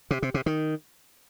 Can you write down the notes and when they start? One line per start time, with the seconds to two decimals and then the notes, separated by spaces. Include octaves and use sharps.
0.11 C3
0.22 C3
0.34 C3
0.46 D#3